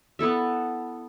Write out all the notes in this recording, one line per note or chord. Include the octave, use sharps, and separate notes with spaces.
B3 E4 A4 E5